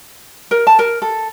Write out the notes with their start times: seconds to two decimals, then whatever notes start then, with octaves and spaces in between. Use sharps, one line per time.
0.51 A#4
0.67 A5
0.79 A#4
1.02 A4